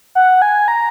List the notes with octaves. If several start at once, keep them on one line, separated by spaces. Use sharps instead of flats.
F#5
G#5
A#5